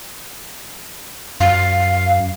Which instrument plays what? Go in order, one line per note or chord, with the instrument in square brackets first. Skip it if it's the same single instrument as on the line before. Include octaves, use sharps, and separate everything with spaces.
[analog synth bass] F#2 [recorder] F5